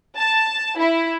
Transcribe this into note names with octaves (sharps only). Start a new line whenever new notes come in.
A5
E4